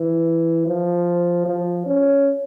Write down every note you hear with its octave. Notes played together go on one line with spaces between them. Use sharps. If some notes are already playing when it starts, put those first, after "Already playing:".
Already playing: E3
F3
F3
C#4